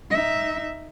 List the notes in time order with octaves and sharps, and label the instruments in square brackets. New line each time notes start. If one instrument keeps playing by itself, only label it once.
[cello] D#4 E5